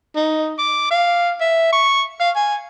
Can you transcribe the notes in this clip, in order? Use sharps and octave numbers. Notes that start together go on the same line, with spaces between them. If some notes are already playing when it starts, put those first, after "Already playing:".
D#4
D6
F5
E5
C#6
F5
G#5